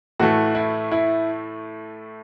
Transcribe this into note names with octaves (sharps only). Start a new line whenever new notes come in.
A2 E3 A3 F#4
E4
E4